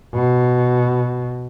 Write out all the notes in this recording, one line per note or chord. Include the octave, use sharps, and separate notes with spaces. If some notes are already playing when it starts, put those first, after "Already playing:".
B2